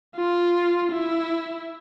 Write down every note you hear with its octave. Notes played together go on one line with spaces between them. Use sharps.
F4
E4